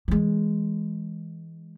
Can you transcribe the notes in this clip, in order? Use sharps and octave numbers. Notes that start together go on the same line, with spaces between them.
E3 G#3